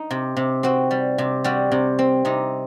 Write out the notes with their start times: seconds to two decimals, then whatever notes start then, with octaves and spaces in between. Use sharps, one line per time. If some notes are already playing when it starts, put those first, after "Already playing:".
Already playing: D#4
0.11 C3
0.37 C3
0.63 C4 F#4
0.91 G3
1.18 C3
1.44 G3 F#4
1.71 C3
1.99 C4
2.25 C3 D#4